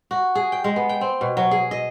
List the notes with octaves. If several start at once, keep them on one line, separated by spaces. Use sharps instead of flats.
F#4
G#4
G5
G#3
B3
G5
C4
B2
F#3
G#4
D#5